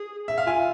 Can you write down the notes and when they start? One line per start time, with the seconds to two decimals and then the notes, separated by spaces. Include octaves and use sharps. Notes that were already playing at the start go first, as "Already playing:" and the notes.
Already playing: G#4
0.28 E5
0.38 F5
0.46 F4 G#5